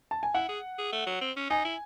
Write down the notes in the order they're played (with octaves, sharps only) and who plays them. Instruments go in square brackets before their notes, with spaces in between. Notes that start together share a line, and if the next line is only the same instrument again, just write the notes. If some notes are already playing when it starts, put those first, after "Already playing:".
[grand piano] A5
G#5
[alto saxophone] E4 [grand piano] F#5
[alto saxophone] G#4
G#4
A3
F#3
C4
C#4
[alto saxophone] D#4 [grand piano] G#5
[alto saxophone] E4